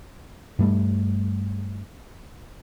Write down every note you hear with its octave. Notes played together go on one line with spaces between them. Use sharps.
G2 G3 A3